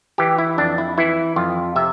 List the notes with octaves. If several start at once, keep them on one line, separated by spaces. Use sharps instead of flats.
E3 G4
E4
F2 D4
E4
E3 E4
F2 F4
C3 E5